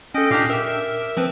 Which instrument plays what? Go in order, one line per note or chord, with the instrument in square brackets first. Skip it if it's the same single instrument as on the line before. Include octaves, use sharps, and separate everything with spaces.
[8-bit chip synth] C#4 A4 [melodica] D#5 G5
[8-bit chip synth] A#2 D4 [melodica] G4 F5
[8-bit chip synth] A#4 [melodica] E5
[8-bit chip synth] F3 C4 B4